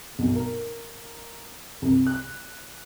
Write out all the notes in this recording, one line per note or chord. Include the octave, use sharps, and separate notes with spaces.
B1
A#4
C2
F#6